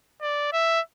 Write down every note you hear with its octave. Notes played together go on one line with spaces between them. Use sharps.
D5
E5